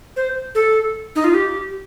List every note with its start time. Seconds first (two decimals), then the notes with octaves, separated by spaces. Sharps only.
0.16 C5
0.55 A4
1.15 D#4
1.24 F4
1.34 G4